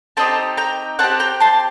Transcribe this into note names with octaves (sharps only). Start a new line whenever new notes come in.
C4 D#4 G4 A5 C6
G5 A#5
C4 F#5 A5
G4
G5 A#5
A5 C6